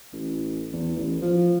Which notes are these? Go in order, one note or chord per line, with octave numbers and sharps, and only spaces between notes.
A1
E2
A1
F3